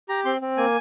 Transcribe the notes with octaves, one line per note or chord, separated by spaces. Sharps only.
G4 A#5
C4 C6
C4
A#3 G#5